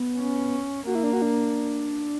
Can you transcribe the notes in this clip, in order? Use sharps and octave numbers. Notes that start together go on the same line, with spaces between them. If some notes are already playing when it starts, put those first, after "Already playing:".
Already playing: B3
C#4
A#3 F#4
E4
D4
F#4
D4